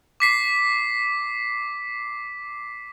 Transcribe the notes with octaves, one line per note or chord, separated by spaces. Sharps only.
D6 B6 C7